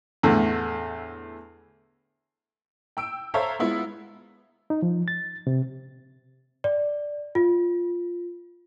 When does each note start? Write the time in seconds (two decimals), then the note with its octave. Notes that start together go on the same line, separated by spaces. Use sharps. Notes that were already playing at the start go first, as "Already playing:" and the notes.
0.23 E2 A2 D3
2.97 G5 E6 D7
3.34 A4 C5 C#5 E5 F5 A#5
3.59 G#3 B3 E4 F4
4.70 D#4
4.82 F3
5.08 A6
5.47 C3
6.64 D5
7.35 F4